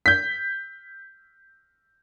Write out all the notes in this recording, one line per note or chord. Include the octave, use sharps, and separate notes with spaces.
G6 B6